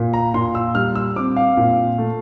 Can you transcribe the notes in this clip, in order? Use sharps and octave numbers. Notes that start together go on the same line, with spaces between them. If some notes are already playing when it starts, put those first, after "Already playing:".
Already playing: A#2
A#5
A#2 C6
E6
G3 F6
E6
C4 D6
F5
A#2
A3